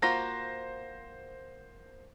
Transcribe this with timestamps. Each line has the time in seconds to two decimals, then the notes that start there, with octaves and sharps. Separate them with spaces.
0.02 A#3 F4 F#4 C5 A#6